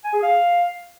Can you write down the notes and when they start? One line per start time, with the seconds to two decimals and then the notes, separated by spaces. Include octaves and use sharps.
0.05 G#5
0.14 G#4
0.23 F5